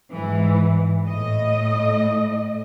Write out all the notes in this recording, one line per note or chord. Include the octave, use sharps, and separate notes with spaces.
G#2 E3
A2 A3 D#5